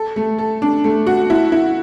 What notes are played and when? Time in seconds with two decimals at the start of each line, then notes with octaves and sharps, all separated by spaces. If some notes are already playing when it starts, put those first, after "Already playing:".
Already playing: A4
0.16 A3
0.38 A4
0.62 D4
0.84 A3
1.07 F#4
1.30 E4
1.52 E4